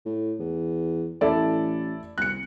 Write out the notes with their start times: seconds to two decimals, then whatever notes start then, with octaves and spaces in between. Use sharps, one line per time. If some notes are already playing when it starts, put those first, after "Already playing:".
0.05 A2
0.40 E2
1.21 A1 E4 A4 D5
2.18 C2 F#6 C#7